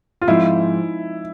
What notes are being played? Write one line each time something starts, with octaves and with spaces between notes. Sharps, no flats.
F4
G#2 F3 C4 E4